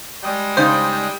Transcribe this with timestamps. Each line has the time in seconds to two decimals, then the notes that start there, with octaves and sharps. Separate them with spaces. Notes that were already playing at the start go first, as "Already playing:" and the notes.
0.24 G3 G#3 D5 G5 D#6
0.57 C#3 D#4 C5